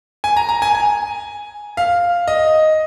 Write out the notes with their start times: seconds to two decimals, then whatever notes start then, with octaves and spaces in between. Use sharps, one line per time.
0.24 G#5
0.37 A#5
0.49 A#5
0.62 G#5
0.75 G#5
1.77 F5
2.28 D#5